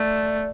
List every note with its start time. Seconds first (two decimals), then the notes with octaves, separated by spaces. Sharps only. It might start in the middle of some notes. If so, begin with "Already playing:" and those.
Already playing: A3 D5